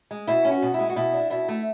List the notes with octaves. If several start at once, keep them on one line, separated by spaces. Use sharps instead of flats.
G#3
B2 E4
C#4
F#4
B2
G#3 E4
F#4
B2 E4
D4
B2 E4
A3